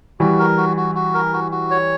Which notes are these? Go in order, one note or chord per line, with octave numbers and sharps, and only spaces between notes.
E3 G3 F#4
A#4
F#4
F#4
F#4
A#4
F#4
F#4
C#5